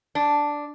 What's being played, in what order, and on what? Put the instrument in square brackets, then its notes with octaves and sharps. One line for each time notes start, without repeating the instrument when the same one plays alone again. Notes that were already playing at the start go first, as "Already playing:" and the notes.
[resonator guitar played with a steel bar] D4